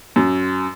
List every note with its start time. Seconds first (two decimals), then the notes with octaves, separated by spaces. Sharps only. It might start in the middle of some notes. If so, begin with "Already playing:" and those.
0.16 F#2